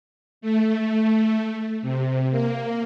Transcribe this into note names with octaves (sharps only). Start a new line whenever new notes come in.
A3
C3
A#3